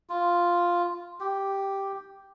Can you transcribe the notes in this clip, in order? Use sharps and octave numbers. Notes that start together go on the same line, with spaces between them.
F4
G4